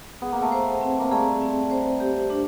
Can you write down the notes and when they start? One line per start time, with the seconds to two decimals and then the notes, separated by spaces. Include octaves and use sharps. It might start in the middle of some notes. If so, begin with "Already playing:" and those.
0.22 B3 G#4
0.32 A#3
0.42 A3 B3
0.52 C5
0.81 C4
1.00 A#3
1.11 G3 A3 G#4
1.41 C4
1.71 C5
2.00 G4
2.30 D4